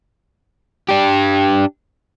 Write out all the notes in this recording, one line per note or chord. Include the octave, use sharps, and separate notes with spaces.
D4 G4